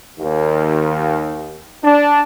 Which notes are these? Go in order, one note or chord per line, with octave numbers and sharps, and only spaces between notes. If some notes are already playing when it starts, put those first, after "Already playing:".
D#2
D4